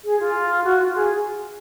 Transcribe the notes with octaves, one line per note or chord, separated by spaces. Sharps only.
G#4
F4
F#4
F4
G#4